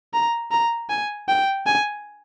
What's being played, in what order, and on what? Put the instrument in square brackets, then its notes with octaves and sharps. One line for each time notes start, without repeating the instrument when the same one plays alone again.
[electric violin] A#5
A#5
G#5
G5
G#5